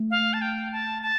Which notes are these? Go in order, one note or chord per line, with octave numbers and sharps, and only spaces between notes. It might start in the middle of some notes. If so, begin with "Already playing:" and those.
Already playing: A3
F5
A5
G5
A5
A5